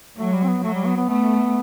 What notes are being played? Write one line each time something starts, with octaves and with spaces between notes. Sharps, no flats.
F#3 A3
G3
C4
B3
F#3 A3
G3
B3
B3
A3 B3